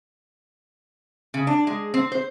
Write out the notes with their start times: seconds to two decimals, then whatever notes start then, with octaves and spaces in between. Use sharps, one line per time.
1.34 C#3
1.47 D4
1.67 G#3
1.94 C4
2.12 C5